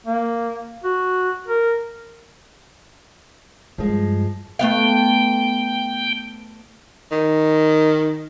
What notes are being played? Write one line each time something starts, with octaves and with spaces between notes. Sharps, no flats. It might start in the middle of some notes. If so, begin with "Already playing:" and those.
A#3
F#4
A#4
G2 F3 G#3
A3 B3 F5 G5
D#3